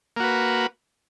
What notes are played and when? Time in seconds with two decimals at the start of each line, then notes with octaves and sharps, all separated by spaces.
0.17 A#3
0.20 F#4
0.23 B4